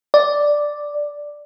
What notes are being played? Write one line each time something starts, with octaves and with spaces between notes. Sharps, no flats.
D5